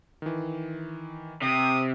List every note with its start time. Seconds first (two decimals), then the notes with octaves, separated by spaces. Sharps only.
0.22 D#3 E3
1.42 C3 D#6